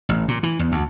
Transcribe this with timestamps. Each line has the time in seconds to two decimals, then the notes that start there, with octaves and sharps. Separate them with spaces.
0.09 A1
0.28 A#2
0.43 E3
0.59 E2
0.72 D2